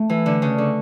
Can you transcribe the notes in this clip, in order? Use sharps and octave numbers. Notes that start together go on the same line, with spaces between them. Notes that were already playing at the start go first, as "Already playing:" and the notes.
Already playing: A3
E3
D3
C#3
D3